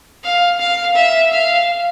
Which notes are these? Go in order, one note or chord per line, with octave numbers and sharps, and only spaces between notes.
F5
F5
E5
F5